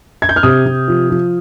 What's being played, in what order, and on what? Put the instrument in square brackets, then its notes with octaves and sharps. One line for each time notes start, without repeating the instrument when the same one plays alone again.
[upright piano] G#6
G6
F6
C3 D#6
C3
F3
F3